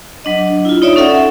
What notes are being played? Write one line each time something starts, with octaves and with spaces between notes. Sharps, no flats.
F#3 D4 D#5
E4 F4
D#4 C#5 D5 E5
C#4 A4 E5 F#5